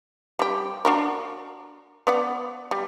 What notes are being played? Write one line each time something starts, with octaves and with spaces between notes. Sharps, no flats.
G3 G4
D4 F#4 A#4
B3 D5 F#5
G3